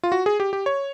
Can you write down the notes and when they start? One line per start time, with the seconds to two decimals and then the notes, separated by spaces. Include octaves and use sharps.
0.03 F4
0.12 F#4
0.26 G#4
0.40 G4
0.53 G4
0.66 C#5